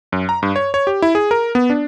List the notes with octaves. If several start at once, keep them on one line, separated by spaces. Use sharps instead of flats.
F#2
A#5
G2
C#5
C#5
G4
E4
G#4
A#4
B3
D4